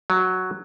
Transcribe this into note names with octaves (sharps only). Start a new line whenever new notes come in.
F#3